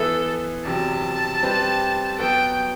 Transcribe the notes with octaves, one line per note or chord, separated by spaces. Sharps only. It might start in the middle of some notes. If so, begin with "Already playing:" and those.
Already playing: E3 B3 E4 A4 B4 E5
E2 C3 F#3 A5
G3 C4 G4 B4
F#3 B3 F#4 A4 G5